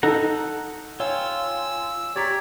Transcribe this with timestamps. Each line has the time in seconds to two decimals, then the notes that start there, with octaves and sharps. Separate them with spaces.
0.03 D#4 A4 F#5 A#5
1.00 F4 C#5 G5 G#5 E6
2.16 G4 C#5 D5 A#5 B6